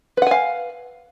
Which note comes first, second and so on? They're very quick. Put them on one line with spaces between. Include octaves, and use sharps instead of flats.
B4 F#5 G#5 F5